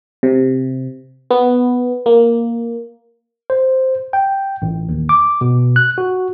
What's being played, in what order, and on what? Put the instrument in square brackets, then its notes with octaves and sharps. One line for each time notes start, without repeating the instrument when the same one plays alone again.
[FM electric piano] C3
B3
A#3
[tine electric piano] C5
G5
A1
D#2
D6
B2
F#6
F#4